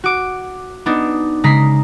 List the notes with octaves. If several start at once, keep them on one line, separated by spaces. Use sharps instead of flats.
F#4 D6
B3 D4 D#4
C#3 G#3 A#5 B6 C7